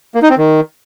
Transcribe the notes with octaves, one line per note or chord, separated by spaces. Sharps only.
A#3
D#4
C4
D#3